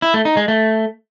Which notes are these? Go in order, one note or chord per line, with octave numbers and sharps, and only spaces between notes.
E4
A3
D#4
G#3
A3